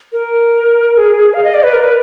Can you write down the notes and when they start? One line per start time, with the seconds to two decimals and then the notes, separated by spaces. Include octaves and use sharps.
0.12 A#4
0.93 A#4
0.97 G#4
1.33 F5
1.44 D#5
1.54 D5
1.63 B4
1.73 A#4
1.83 B4